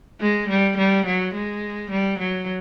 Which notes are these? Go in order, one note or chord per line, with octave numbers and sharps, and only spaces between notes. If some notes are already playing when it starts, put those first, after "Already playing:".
G#3
G3
G3
F#3
G#3
G3
F#3